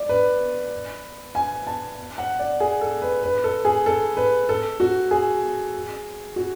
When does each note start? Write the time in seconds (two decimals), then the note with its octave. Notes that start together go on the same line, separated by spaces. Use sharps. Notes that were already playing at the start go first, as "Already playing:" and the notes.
Already playing: D5
0.09 B4
1.35 G#5
1.67 A5
2.18 F#5
2.39 D5
2.60 G#4
2.81 A4
3.02 B4
3.23 B4
3.44 A4
3.65 G#4
3.86 A4
4.17 B4
4.49 A4
4.80 F#4
5.11 G#4
6.36 F#4